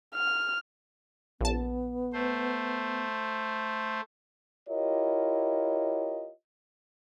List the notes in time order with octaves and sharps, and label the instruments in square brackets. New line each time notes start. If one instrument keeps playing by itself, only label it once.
[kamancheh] F6
[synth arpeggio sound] A#1 A5 [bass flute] B3
[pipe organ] A3 C5
[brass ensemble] E4 F4 G4 A#4 C#5 D#5